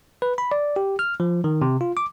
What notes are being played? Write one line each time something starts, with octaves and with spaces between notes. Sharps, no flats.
B4
B5
D5
G4
F6
F3
D#3
C3
F4
D6